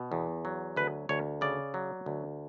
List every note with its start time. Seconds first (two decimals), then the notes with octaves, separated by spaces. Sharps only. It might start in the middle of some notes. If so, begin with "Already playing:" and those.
Already playing: B2
0.12 E2
0.45 F#3
0.76 D2 B4
1.09 D2 C#5
1.41 C#3 D5
1.74 F#3
2.06 D2